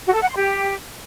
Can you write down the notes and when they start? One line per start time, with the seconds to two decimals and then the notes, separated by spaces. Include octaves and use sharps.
0.06 F#4
0.14 A4
0.21 F#5
0.29 C6
0.36 G4